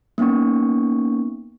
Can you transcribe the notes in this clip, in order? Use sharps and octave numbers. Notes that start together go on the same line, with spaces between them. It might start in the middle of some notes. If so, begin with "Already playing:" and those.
A#3 B3 C#4 D#4 C#6